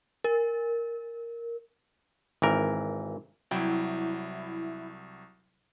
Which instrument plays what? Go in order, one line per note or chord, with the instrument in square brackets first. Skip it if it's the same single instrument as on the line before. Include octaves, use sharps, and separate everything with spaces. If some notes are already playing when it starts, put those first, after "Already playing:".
[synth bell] A#4
[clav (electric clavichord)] G#1 E3 A#4
[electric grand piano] C2 F#3 G5 [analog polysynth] E4